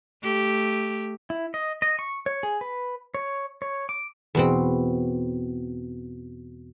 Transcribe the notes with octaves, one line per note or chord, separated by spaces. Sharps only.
A3 G4
E4
D#5
D#5
C#6
C#5
G#4
B4
C#5
C#5
D6
E2 B2 C4